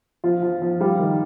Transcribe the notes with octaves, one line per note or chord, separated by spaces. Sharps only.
F3 F4
F3
F3
G3 F4
D#3